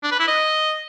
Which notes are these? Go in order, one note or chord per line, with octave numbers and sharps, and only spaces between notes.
D4
B4
E4
D#5